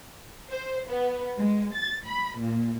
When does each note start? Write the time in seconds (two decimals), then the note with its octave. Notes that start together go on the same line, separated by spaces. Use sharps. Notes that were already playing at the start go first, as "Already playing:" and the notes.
0.51 C5
0.89 B3
1.37 G#3
1.73 A6
2.04 B5
2.37 A#2